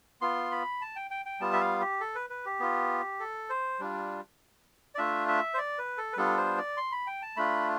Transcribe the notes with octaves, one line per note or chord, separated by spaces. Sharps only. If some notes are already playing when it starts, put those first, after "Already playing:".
B3 F4 C6
B5
A5
G5
G5
G5
G3 B3 F4 A5
E5
F5
G4
A4
B4
B4
G4
B3 F4
A4
C5
G3 D4 F4
D5
A3 D4 F4 E5
E5
C5
D5
B4
A4
B4
G3 B3 D4 F4 A4
C5
D5
C6
B5
G5
A5
A3 D4 F4 B5